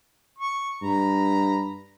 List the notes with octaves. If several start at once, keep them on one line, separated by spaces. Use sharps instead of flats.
C#6
G2 A#5 B5